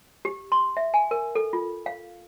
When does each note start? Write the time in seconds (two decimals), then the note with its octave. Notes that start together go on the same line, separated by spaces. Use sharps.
0.25 G4
0.52 C6
0.77 E5
0.94 G#5
1.11 A#4
1.35 A4
1.53 F4
1.86 F5